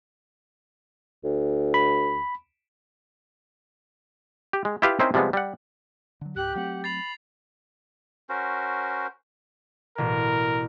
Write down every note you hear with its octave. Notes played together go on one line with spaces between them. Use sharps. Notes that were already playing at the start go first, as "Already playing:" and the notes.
D2
B5
G4
G#3
E4 F4 G4 B4 E5 F5
C4 C#4 D#4 E4 A#4 C5
C3 F3 G3 G#3 B3
G3 F#5
D3 F#3
C#2 G#2 G4 F#6
F#3 A3 C4 F#5
B5 A6 C7 F7
C#4 F#4 A#4 C5
A1 B2 A#4